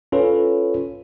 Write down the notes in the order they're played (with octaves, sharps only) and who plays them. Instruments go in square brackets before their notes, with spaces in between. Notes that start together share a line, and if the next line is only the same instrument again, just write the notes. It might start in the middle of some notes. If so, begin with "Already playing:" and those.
[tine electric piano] C#4 F4 A4 B4 C#5